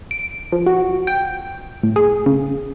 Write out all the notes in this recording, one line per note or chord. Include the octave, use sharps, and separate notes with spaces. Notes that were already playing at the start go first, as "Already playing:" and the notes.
D7
F3
F#4
G5
A2
G#4
C#3